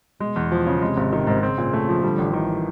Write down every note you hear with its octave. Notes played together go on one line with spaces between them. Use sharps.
B2 G#3
E2
F3
C#3
C3 G#3
G#1
D#3
G#2
C#3 C4
A#2
A3
F3
D3 G3
A1
D#3 E3